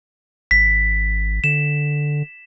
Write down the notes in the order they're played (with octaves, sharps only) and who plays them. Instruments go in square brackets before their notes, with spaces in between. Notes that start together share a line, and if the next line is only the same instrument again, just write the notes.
[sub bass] G#1 [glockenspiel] B6
[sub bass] D3 [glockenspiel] E7